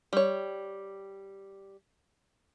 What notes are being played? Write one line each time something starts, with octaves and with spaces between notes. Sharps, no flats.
G3 C#5